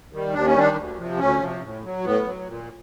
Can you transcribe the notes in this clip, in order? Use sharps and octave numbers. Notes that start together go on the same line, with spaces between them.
D#3 G3
D#2 D4
C#4
D#3 G3 D4
D2
C3 F3
D2 C#4
C3 F3
A2
F#3
A2 B3
F#3
A#2